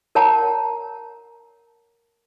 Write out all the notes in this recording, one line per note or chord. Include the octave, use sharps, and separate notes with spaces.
A#4 C#5 F#5 A5 A#5